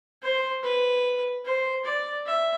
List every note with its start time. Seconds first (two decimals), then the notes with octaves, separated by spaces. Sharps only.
0.22 C5
0.63 B4
1.45 C5
1.85 D5
2.26 E5